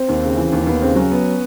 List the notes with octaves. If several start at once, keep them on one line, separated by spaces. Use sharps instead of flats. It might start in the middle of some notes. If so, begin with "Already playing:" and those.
Already playing: C4
D#2
C#3
E3
D#2
D#2 B3
C#3 C4
F#3 C#4
B3